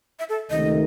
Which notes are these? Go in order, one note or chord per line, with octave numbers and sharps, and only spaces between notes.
E5
A4
C#2 C3 D#3 A3 D#5